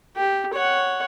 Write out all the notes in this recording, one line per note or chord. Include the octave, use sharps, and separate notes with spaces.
G4
C#5 F#5